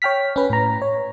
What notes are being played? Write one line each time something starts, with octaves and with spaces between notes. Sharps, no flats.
C#5 G5 F6 B6
C#4 B4
A2 A#5
C#5